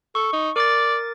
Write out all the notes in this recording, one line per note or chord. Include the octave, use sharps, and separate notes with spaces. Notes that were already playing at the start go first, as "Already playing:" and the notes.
A4 C#6
D#4
A#4 D5 D6 A6